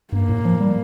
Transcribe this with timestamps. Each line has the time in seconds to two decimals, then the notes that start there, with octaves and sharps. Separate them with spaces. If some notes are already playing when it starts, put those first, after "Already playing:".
0.12 G2 A#3
0.29 A2
0.45 F3
0.60 G3